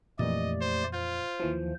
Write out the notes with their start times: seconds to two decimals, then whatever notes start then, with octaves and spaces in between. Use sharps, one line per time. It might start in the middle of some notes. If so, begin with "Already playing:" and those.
0.19 F2 A#2 E3 A3 G4 D5 D#5
0.61 C5
0.93 F4 C5
1.40 D#2 E3 F3